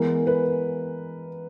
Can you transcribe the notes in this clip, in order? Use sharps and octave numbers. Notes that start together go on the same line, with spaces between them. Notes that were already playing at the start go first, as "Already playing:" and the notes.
Already playing: E3 G#3 B3 A#4
B4